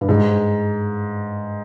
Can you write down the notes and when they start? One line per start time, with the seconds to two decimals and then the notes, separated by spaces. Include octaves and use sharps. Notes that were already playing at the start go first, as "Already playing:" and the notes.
0.01 G2
0.09 G#2